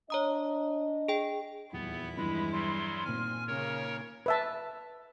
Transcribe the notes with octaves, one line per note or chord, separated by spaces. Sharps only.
D4 C#5 D#5 A#5 D#6
G#4 G5
D#1 E2 B3 E4
G2 E3 F3 G#3 B5
F#3 G3 C6
A#2 D#3 C4 G#5 F6
C#3 A#3 A#4 C#5
B4 E5 A5